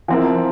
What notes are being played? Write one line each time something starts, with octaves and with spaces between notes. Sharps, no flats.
F3 C4 E4 A#4